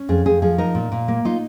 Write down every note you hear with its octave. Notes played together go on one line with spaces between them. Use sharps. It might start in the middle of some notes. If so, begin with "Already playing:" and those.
Already playing: C#4
F2 G#4
F2 G#4
F3 G#4
D#4 A#4
A#2
A#2
A#3
D#4 F4